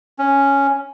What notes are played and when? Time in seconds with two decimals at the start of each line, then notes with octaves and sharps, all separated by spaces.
0.19 C#4